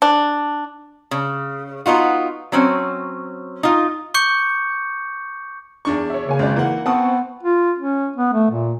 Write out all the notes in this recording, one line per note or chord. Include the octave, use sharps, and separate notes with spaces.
D4
C#3
B3 D#4 F4 F#4
F#3 C4 C#4
D#4 F4
C#6 D6 G6 C#7
E2 D4 C#6
C#5 E5
C#3 A#3 C#5 G#5
G#1 C#2 D5
E3 A#3 F#5
B3 C4 F#5 A5 C#6 D#6
F4
C#4
B3
A3
A#2